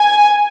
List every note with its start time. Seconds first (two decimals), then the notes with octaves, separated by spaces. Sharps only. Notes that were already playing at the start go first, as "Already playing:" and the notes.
Already playing: G#5